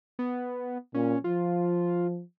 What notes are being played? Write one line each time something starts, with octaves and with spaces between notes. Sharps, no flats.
B3
A#2 C#4
F3 F4